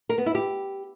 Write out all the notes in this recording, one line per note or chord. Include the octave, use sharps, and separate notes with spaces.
A#4
B3
E4
G4